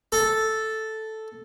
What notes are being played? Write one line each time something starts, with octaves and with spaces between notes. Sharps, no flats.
A4